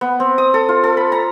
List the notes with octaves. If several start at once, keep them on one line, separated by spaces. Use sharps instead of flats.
B3
C4
D#6
A4
F4
A4
B5
A#5